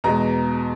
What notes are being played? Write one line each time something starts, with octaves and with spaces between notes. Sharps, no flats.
E2 B2 G#3 A#5